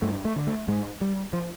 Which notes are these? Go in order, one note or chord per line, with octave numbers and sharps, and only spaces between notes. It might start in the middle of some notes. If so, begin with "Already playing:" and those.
G2 A3
A3
D3
A3
G#2 G#3
G3
F3